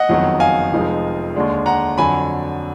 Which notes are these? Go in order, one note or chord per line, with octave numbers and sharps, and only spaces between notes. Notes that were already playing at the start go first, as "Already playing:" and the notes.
Already playing: D#5 F#5
F#1 F2 D#3 F#3 B3
F5 G#5
F1 F2 F3 G#3 D#4
D#2 D3 G#3 D4
F#5 A#5
F2 D3 F#3 G#5 B5